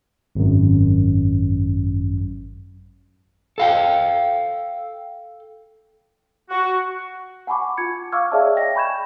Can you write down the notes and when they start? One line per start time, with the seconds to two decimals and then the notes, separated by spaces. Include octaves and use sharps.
0.35 G#1 F#2
3.58 A4 F5 G5
6.50 F#4 C#6
7.47 F#5 G#5 A5 B5 C#6 D6
7.77 F4 G#6 C#7
8.12 F5 C#6 D6 E6 F6 G#6
8.32 G#4 C#5 D5 E5 F5 A5
8.55 D#5 G5 A#6
8.75 G#5 B5 C#6 G6 G#6 E7